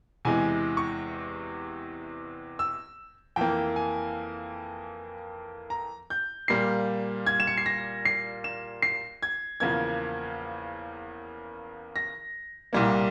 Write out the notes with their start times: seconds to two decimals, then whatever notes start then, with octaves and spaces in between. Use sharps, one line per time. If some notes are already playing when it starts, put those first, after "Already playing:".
0.25 E2 C3 E3 G#3 G#5
0.77 C#6
2.59 E6
3.36 F2 E3 A#3 G5
3.76 G#5
5.70 A#5
6.10 G6
6.48 A#2 G3 A#3 C7
7.27 G#6
7.40 E7
7.47 C#7
7.58 C7
7.66 A#6
8.05 C7
8.44 E7
8.82 C7
9.23 G#6
9.60 E2 C#3 F3 A#3 G#6
11.96 A#6
12.73 C2 A#2 G3 A#3